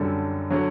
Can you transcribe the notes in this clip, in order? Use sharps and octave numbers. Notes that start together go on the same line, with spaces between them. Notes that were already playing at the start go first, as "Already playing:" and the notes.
Already playing: F#2 D3 G3 A4
D3 F#3